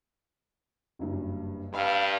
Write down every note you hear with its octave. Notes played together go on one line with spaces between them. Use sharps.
F#1 G2
G2 F5 B5 E6